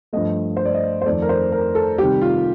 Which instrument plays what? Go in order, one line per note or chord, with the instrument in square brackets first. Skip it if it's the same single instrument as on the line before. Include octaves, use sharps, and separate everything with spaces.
[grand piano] G2 F3 A3 D#5
C5
D5
D#5
C5
F2 D#3 A3 D5
A#4
C5
A#4
A4
C3 D#3 G3 G4
F4